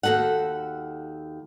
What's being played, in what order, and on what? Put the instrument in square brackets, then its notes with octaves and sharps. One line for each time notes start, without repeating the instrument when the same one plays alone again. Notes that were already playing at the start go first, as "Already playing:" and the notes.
[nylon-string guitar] D#2 D#3 F#4 A4 F#5